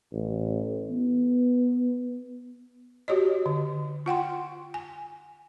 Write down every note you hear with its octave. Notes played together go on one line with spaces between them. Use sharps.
A1
B3
F#4 G4 C#5 D#5
D3
F4 F#5 G5 C6
G#5